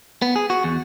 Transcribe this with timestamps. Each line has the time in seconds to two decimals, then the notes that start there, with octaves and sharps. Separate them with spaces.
0.22 B3
0.36 G#4
0.50 F#4
0.64 E2